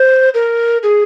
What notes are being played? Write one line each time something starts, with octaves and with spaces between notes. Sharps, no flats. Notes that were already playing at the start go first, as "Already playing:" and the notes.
Already playing: C5
A#4
G#4